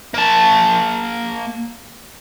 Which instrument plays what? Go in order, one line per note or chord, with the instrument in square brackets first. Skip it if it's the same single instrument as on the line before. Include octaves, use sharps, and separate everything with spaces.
[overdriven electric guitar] A#3 A5